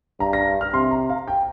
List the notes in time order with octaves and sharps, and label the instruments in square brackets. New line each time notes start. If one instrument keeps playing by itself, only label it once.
[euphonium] G2 [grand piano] A#5
[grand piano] A#6
F6
[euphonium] C3 [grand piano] C6
[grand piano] A#5
F5
G5